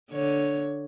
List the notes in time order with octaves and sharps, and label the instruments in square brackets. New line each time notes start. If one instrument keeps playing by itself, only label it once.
[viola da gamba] D3 C#5